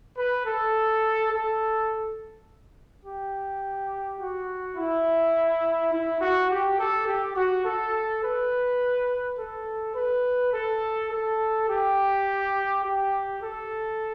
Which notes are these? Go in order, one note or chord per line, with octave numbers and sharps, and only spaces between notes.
B4
A4
A4
G4
F#4
E4
E4
F#4
G4
A4
G4
F#4
A4
B4
A4
B4
A4
A4
G4
G4
A4